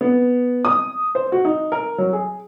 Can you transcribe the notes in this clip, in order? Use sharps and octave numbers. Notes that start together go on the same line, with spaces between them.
B3
D#6
C5
F#4
D#4
A#4
F#3
G#4